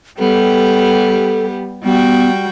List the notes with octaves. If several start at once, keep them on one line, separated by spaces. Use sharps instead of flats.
G3 B3 G4 A4
G3 B3 F#4 G5